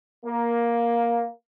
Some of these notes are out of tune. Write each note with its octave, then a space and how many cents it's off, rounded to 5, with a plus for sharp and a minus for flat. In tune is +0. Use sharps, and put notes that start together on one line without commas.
A#3 +10